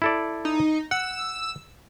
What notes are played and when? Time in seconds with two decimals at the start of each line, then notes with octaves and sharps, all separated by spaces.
0.02 E4 A4 D5
0.45 D#4
0.91 F#5 E6